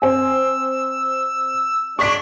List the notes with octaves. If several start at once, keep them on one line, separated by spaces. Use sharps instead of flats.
C4 G#5 E6
G#3 D4 D5 C#6 B6 D7